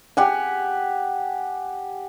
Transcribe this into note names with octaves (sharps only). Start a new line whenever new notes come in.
G4 F#5 G#5